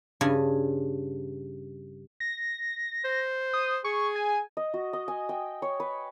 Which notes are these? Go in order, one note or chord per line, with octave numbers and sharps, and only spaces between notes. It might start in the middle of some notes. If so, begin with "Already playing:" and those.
G2 C#3 G#5
A#6
C5
D#6
G#4 C#6
G#5
D#5
F#4
D#5
G#5
G5
C#5
B4